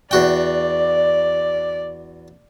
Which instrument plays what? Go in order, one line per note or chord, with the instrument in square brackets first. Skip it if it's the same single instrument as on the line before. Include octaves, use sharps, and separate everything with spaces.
[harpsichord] E2 F#4 G5 [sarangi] D5